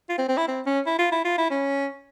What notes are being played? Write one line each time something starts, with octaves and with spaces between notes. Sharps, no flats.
F4
C4
C4
E4
C4
C#4
E4
F4
E4
F4
E4
C#4